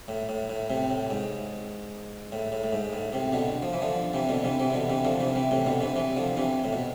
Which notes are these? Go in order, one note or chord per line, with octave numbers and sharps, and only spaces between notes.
A2
A2
A2
A2 C3
A2
G#2
A2
A2
A2
G#2
A2
A2 C3
B2 D3
F3
E3
D3 F3
C3 E3
B2 D3
C3 E3
C3 E3
C3
B2 D3
C3 E3
D3 F3
C3 E3
C3 E3
A2 C3
B2 D3
C3 E3
C3 E3
D3 F3
C3 E3
A2
B2